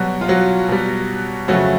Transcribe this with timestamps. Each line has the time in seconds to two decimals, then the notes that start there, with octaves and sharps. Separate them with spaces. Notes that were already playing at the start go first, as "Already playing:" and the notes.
Already playing: B2 F#3 G3 F#4
0.21 F4
0.28 F#3 F#4
0.68 B2 G3
1.48 F2 C#3 F#3 A3 F#4